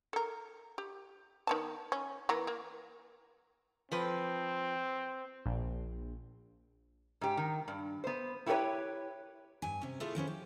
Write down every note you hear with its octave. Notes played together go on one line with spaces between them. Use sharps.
A4 A#4
G4
D#3 B3 A5
C#4
E3 B3 A#4
A#3
F3 C4 B4
A#1
G#2 G4
D#3
G2
B3 C5
E4 F#4 G4 A4 B4 C#5
G2 G#5
C3 C#4
A3 E4 F4 G#4 A4
D#3 F3 C#4 B4
G4